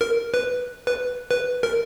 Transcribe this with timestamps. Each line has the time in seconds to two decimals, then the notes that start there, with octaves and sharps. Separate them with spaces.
0.01 A#4
0.34 B4
0.87 B4
1.31 B4
1.63 A#4